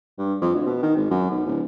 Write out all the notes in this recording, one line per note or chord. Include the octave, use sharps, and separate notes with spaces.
G2
F2
D2
B2
D#3
G#1
F#2
B1
D1